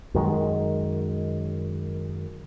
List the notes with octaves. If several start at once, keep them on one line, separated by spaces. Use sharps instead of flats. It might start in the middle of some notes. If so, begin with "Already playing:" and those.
F#2 D#3 G#3